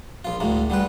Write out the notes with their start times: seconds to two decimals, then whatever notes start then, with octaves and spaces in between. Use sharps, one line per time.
0.25 A#1 F4
0.40 D2 A2 G#3 A#3
0.70 D3 G3 G#3 B4